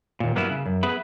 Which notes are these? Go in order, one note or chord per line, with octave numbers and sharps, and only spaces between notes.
D#2 A#2
G2 F#3 A#3 B3 C#4 E4
C#3
F#2
B3 G#4 B4 E5 B5